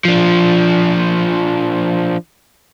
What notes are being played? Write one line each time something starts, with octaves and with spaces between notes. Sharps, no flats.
F3 D4